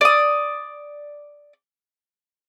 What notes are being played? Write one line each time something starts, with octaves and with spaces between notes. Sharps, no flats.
D5 D#6